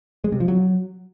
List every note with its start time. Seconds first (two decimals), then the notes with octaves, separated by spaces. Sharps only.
0.24 G#3
0.32 C3
0.40 F3
0.48 F#3